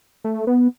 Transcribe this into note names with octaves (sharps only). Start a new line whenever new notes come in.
A3
B3